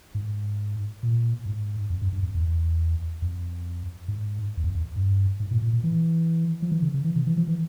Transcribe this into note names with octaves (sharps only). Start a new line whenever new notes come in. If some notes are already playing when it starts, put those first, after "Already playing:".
G#2
A#2
G#2
F2
G2
G2
F2
E2
F2
G#2
E2
F2
E2
G2
G#2
A#2
A#2
A#2
E3
F3
E3
C#3
C#3
E3
C3
E3
F3
E3